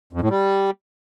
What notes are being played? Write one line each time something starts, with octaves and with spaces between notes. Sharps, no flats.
F2
A2
G3